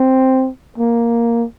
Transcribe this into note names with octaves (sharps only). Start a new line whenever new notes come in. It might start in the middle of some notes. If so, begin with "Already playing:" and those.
Already playing: C4
A#3